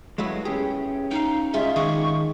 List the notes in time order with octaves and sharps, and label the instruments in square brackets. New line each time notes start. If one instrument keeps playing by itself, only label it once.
[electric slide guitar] F#3 G#3 [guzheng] A3 B3 E4
[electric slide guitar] C#4 G4 [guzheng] G#4
[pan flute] D#4 [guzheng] F5 G5
[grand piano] G#3 D#5 [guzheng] C#4 F4 [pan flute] E5
[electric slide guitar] D#3 [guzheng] G#4 D5 [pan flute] C#6